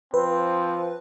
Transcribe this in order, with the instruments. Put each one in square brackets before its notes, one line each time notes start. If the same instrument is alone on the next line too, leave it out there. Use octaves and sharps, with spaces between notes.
[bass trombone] F3 [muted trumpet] C4 [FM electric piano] B4